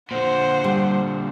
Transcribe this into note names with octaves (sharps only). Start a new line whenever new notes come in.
A#2 D3 C5 F#5
G3